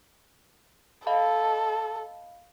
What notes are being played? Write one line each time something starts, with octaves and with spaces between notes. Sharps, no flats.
A4 D#5 F5 B5